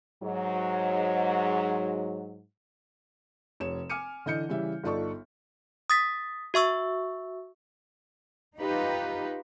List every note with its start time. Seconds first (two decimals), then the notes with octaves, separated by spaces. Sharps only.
0.22 G#2 F#3
3.60 F1 C#5 E7
3.90 G#5 D6 F6 C#7 D#7
4.26 D3 E3 D#5 G6 C#7
4.49 C#3 E3 G3 E5
4.84 G1 D#4 F4 A4 D5 C#6
5.90 D#6 A6 B6
6.54 F#4 E5 C#6 E6
8.57 D#4 F4 G4 B4